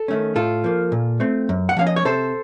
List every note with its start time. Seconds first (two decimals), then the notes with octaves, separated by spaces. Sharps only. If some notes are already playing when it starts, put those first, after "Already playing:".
Already playing: A4
0.08 D#3 A3 C#4
0.35 A2 F4 A4
0.64 F3 A#3
0.92 A#2
1.20 A3 C4
1.49 F#2
1.69 F#5
1.77 F3 A#3 C#4 F5
1.87 D#5
1.96 C#5
2.05 C3 A4 C5